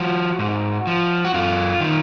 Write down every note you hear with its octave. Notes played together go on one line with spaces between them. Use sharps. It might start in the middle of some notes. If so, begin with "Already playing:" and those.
Already playing: F3 F#4
G#2
F3
F#4
F#2 F4
D#3